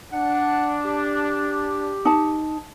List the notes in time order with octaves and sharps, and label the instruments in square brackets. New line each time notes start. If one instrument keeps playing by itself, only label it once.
[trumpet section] D4 [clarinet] F#5
[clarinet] G4
[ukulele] D#4 A5